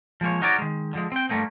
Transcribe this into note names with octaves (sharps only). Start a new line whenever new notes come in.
F3 G#3 A#3 C#5
D#4 F#4 A#4 C#5 D5
D#3 G#3
D3 F3 G#3
C4 G5
G2 F3 G3 A3 A#3 C4